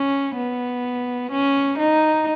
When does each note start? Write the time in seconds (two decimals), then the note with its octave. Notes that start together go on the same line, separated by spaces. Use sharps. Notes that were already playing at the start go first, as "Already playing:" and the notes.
Already playing: C#4
0.37 B3
1.31 C#4
1.78 D#4